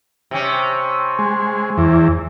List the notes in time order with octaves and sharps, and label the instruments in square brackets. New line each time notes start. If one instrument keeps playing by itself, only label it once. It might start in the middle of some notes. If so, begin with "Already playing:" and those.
[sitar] C3 C#4
[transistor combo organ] G#3
E2